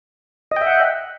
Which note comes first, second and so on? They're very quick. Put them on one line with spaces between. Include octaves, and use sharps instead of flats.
D#5 G5 E5 F#5